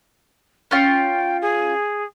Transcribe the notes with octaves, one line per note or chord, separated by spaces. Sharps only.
C#4 F4 G5
G#4